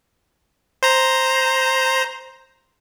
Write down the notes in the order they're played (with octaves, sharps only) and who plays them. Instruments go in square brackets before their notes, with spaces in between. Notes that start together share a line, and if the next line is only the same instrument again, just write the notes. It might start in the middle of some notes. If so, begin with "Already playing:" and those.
[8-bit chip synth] C5 A#5